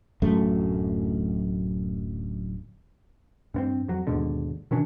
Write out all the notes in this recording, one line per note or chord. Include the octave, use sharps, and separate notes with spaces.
D1 F#2 A3
G2 B3 C4
F2 F#3
D#2 G#2 B2 D3
B2 D#3 C#4 D4